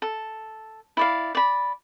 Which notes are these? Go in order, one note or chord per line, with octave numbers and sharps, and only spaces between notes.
A4
E4 D5 F5
D5 B5